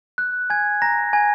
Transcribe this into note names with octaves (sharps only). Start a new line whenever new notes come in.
F#6
G#5 G#6
A#5 A#6
G#5 G#6